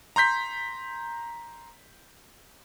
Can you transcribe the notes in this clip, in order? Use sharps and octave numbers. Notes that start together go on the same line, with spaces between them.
A#5 C6 G6 B6